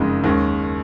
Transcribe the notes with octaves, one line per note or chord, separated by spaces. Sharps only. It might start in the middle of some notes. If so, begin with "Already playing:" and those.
Already playing: F#1 F2 C#3 G#3 D#4
D#2 D#3 G#3 C#4